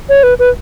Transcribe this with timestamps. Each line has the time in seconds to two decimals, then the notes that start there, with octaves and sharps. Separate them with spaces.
0.09 C#5
0.23 B4
0.39 B4